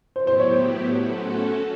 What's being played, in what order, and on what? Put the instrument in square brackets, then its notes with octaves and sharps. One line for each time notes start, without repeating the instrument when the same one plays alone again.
[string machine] A2 F#3 B3 E4 G4 [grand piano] C5
[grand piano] C5
C#5
C5
[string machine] A3 C#4 F#4 A4